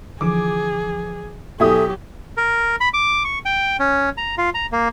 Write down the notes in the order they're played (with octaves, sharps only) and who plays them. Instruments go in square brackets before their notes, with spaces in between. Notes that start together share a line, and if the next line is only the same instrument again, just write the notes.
[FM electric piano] D3 E3 F3 [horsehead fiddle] G#4 [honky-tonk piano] D6
[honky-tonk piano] B2 E4 D#6 [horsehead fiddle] F#3 G4 [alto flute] A4 [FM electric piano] G#5
[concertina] A#4
B5
D6
C#6
G5
C#4
A#5
F4
A#5
A#3